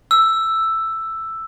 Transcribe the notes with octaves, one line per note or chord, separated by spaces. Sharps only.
E6